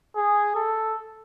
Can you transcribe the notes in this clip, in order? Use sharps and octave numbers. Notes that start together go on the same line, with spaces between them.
G#4
A4